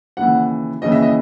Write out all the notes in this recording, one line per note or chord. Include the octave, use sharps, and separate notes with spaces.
D#2 C#3 E3 F#5
D#2 C#3 E3 D#5
E5
D#5